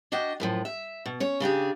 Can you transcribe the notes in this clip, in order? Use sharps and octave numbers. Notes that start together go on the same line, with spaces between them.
D4 F#4 D#5 G5
F#2 A2 F3
E5
B2
C#4 C#5
C#3 D4 G4 G#4